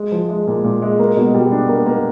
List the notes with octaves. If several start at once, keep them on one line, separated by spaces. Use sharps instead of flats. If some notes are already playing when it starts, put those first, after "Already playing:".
Already playing: G#3
F3
G#3
A#2
A#2
G#3
A#3
B2
G3
D4
A#3
A#3